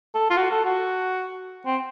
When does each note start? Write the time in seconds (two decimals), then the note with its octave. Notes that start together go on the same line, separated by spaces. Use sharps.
0.15 A4
0.30 F4
0.36 F#4
0.51 A4
0.65 F#4
1.66 C4